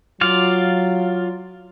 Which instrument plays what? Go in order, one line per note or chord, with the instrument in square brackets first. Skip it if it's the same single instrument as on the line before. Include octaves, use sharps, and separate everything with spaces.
[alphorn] F#3 [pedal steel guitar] F4 D5 F5